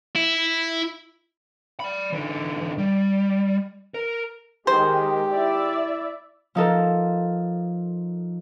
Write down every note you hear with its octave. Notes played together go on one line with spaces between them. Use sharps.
E4
D5 B5
D3 E3
G3
A#4
D#3 G#3 G4 C5
E4 D5 E5
F3 D#4 A4 A#4